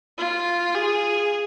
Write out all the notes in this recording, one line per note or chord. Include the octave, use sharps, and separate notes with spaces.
F4
G#4